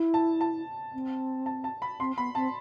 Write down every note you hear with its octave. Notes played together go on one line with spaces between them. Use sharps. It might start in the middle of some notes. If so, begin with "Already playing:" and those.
Already playing: E4
A5
A5
C4
A5
A5
B5
C4 C6
B3 B5
C4 A5